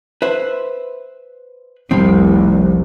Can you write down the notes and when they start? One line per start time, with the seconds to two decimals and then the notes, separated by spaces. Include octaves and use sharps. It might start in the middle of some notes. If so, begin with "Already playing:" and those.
0.22 B4 C5 E5
1.91 F1 C2 F3 G3 C4